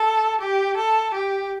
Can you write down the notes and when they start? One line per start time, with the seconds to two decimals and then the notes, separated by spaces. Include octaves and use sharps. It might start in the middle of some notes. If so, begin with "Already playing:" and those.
Already playing: A4
0.41 G4
0.77 A4
1.14 G4